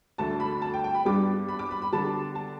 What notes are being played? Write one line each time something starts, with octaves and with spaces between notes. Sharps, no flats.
D2 D3 A3 A5
B5
A5
G5
G5
B5
G2 G3 B3 D4 D6
B5
D6
B5
B5
D3 G3 B3 A5
A5